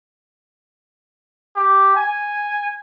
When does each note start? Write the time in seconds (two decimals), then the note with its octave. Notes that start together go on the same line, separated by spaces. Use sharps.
1.56 G4
1.97 G#5